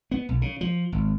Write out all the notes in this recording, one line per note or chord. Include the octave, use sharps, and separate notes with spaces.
B3
B1
C#3
F3
G#1